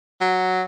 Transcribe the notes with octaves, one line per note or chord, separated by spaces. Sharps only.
F#3